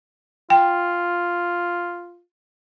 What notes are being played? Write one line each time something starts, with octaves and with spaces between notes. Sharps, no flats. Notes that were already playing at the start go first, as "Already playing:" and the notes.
F4 G5